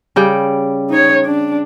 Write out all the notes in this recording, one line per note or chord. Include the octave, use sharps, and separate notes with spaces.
C#3 G3 G5
D#4 C#5
D4